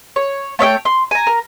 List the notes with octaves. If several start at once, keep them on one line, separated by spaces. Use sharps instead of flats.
C#5
A3 C#5 E5 G5
C6
G#5 A#5
A#4